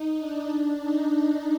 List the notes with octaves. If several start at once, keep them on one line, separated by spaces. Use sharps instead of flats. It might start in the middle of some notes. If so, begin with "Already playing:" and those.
Already playing: D#4
D4
D4
D#4